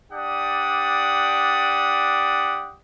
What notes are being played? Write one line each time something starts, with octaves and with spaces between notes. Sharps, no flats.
D4 G4 D5 F#5 D#6